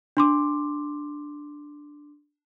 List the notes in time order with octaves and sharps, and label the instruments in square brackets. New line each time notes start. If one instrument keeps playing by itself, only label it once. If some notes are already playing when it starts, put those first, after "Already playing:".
[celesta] D4 C6 D6